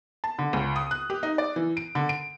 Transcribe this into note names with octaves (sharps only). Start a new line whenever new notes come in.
A5
D3
C#2
D#6
F#6
G4
D#4
D5
E3
D7
D3
D7